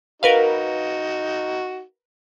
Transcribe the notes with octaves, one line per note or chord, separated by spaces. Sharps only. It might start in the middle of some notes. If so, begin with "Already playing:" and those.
D#4 F#4 A#4 B4 F5